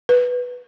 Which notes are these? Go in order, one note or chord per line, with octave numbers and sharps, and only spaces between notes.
B4